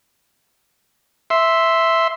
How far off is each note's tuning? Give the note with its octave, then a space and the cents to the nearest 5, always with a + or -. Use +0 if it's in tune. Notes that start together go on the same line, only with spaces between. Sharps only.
E5 +0 C6 +0